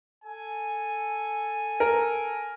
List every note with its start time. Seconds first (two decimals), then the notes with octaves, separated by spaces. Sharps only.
0.24 A4 G#5
1.80 A#4